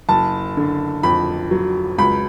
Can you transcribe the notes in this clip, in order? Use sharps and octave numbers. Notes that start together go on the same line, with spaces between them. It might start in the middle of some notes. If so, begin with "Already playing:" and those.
F#1 A5
D3
F2 B5
F#3
C#2 B5